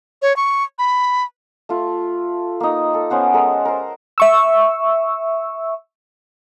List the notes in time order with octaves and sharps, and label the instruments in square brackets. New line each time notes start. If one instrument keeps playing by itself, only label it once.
[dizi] C#5
C#6
B5
[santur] A3 F4
A#3 D#4
A4
B3 C#4 C5 F#5
G#3 A4 A#4 E5
A#4 C5
[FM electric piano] E5 C#6 E6